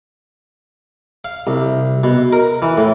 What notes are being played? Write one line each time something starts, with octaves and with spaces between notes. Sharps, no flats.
F5
C2
B2
A#4
E3
A2